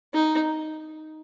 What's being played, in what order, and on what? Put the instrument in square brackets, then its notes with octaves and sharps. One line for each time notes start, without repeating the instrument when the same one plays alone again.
[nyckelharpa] D#4